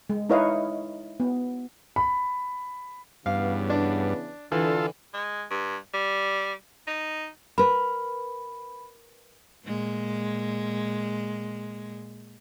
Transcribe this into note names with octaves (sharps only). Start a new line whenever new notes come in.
G#3
D#4 E4 B4 C#5 D#5 F5
B3
B5
G2 C#3 E3 B3 F5
D4
D3 E3 F4 A4
G#3
G2
G3
D#4
A#4 B4 B5
A#2 G#3